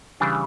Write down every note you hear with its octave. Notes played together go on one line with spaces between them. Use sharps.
C#3 E3 G3 D4